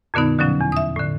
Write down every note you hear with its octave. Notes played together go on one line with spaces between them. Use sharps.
F2 A#2 D3 B3 D#4
B2 D3 F3 F#3 C#4
E2
E5 D#6
A2 D3